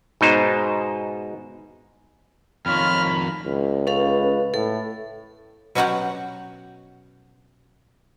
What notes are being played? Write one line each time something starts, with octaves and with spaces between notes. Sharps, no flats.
G#2 B2 D#4 C5
F2 D#3 F4 C#5 B5 F6
C#2
C#4 A4 B4 F5
A2 A4
B2 F#3 C#4 F#4 G4 F#5